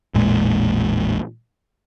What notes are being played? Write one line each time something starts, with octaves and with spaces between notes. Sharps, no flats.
A1 E2 A#2 G#3